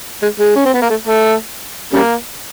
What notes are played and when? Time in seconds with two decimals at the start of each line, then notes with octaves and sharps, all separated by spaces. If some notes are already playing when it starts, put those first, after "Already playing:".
0.22 G#3
0.39 G#3
0.56 C#4
0.65 C4
0.73 B3
0.82 A#3
0.90 A3
1.07 A3
1.93 C#3 G3 A#3